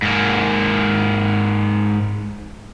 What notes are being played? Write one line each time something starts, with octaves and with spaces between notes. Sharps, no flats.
G#2 A#3